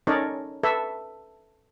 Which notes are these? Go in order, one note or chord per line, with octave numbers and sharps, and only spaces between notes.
C#4 D#4 A4 A#4 C#5 D5
A4 B4 E5